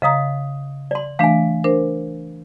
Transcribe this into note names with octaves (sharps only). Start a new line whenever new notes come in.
C#3 D#5 F5 A#5 D#6
D5 C6
E3 A3 D4 F5 G#5
D4 A#4 C5